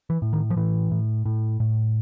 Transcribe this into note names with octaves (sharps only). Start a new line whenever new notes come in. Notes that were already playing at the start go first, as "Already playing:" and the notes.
E3
A2
D#3
F3
A2 E3
A2
A2
A2